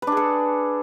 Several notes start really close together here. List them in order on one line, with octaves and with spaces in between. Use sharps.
B4 D4 G#4 A4